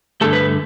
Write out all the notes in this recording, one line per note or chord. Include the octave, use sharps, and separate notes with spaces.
G2 D3 A3 A4
B4